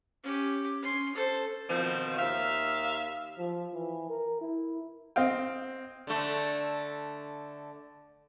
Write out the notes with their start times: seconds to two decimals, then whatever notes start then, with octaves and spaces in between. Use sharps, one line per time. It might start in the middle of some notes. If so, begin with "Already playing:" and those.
0.24 C#4 G4
0.83 C#4 C6
1.14 A4 C5
1.69 B2 D#3 F3 C4
2.19 D#2 E5 F5
3.39 F3
3.74 E3
4.09 A#4
4.41 E4
5.16 C4 D#5 F5 G5
6.07 D3 A3